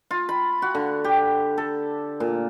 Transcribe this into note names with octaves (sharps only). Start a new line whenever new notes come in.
F4
B5
F#4
D3
G4
A4
A#2